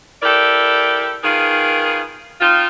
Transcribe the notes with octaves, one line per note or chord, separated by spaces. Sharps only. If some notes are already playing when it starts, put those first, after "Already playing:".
E4 G4 A4 A#4 D5
D#3 F4 G#4 A#4 B4
C4 D#4 F4